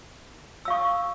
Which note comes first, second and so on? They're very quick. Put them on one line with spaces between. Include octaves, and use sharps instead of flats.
E6 F5 C#6 D#6